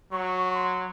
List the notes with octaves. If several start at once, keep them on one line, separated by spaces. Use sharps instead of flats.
F#3 C#6
C6